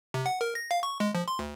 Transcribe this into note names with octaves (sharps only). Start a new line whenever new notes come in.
C3
F#5
A#4
A#6
F5
C#6
G#3
F3
C6
D2